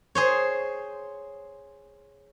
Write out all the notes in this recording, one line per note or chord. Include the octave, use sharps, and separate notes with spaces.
G#4 C5 C#5